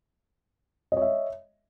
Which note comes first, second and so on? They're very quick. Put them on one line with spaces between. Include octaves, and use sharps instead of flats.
D#5 C#5 E5